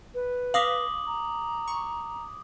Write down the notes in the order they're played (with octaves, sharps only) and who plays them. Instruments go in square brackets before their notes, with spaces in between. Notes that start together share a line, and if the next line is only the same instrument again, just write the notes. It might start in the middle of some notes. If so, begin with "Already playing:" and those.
[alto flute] B4
[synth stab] F5 A#6 B6 [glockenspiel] D6 D#6 F#7
[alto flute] A#5
[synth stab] C#6